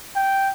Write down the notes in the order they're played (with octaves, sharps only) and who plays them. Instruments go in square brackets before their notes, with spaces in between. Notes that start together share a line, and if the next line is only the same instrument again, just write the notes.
[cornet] G5